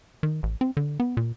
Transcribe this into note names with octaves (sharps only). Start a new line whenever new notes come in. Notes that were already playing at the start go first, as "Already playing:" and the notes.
D#3
A1
C4
D3
B3
A#2